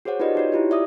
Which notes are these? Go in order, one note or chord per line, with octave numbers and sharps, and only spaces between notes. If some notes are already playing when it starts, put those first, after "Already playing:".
F#4 G#4 C5 C#5 F#5
D#4 F4 G4 B4 D5 D#5
D#4 F#4 C#5
E4 F4 G4
D5 E5 D#6